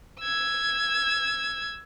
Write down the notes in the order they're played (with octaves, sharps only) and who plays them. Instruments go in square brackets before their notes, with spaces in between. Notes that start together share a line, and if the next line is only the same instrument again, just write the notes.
[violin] E6 G#6